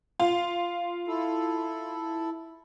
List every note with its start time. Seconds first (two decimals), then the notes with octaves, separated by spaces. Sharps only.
0.20 F4
1.08 E4 A4